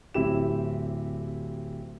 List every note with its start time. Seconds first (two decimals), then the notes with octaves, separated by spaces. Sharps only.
0.14 D1 C4 E4 G4 E7